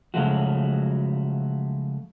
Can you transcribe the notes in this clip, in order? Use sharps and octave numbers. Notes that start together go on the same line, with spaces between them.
C#3 F3 F#3 G#3 A3 F#4